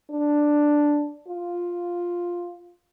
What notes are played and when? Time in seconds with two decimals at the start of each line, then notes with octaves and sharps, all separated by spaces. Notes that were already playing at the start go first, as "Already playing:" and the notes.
0.10 D4
1.28 F4